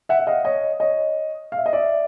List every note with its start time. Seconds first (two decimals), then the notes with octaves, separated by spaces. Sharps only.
0.09 E5 F#5
0.19 E5
0.27 D#5 F5
0.45 C#5 D#5
0.80 C#5 D#5
1.52 F5
1.58 E5
1.66 D#5
1.73 D5 E5